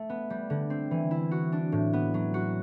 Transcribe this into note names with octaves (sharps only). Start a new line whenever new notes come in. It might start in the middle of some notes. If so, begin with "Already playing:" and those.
Already playing: A3
B3
G3
D3
C4
E3
E4
F#4
D4
A2
B3
F#3
F#4